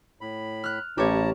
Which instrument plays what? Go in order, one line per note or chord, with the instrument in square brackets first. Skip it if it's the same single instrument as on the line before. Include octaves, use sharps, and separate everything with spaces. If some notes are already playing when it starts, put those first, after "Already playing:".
[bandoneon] A2 B5
[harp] F6 F#6
[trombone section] A1 [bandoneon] E4 A5 A#5 [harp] G4 C#5